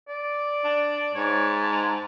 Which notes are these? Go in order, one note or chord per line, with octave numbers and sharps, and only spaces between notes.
D5
D4
G#2 C#5
A5